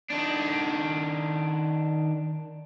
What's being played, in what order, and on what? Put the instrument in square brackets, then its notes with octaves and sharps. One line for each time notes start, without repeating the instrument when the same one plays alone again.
[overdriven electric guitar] D#3 D4